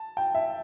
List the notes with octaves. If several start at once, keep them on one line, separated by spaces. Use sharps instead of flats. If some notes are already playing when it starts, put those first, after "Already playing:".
Already playing: A5
G5
E5